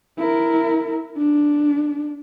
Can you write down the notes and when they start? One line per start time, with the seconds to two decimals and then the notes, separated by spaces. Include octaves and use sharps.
0.18 E4 A#4
1.18 D4